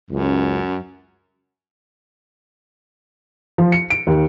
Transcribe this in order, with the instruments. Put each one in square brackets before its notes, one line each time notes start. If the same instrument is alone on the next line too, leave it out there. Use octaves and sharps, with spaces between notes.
[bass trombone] C#2 [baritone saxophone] F#2
[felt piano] F3
C#7
D7
D#2